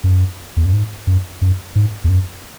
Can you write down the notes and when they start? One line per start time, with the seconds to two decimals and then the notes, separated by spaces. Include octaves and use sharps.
0.04 F#2
0.57 E2
0.65 F#2
0.73 G#2
1.07 F#2
1.41 F#2
1.75 G#2
2.04 E2
2.09 F#2